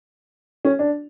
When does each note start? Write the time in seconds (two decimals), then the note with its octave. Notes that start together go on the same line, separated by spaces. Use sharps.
0.65 C#4
0.79 D4